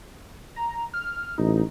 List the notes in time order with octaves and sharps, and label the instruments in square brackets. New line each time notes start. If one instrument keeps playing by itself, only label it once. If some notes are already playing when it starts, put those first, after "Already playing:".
[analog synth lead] A#5
F6
[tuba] A1 [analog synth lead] D#4